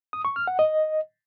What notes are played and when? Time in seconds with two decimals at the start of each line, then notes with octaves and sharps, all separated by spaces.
0.13 D#6
0.25 C#6
0.36 F6
0.47 F#5
0.59 D#5